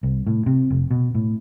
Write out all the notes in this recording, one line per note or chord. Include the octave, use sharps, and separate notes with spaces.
C2
A2
C3
F1
B2
A2